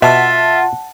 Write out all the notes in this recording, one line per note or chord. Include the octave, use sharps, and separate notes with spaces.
B2 F4 E5 F#5 A5